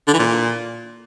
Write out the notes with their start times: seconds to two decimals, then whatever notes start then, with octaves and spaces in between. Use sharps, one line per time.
0.08 D3
0.14 E3
0.19 A#2